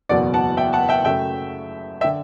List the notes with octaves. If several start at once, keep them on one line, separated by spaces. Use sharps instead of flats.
F#1 E2 B2 F#3 B3 D5 F#5
F#5 A5
E5 G5
F#5 A5
E5 G5
F#2 C#3 F#3 A3 E5 G5
E5 G5
D3